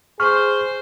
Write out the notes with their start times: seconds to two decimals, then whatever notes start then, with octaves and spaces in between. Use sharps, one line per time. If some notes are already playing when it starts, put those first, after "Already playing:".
0.20 G#4 C5 C#6 F6